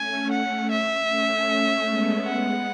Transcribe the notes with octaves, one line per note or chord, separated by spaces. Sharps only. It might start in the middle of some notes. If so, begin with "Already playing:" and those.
Already playing: A3 C#4 G#5
F#5
E5
A3 C#4
G#3 B3
G#3 B3 F#5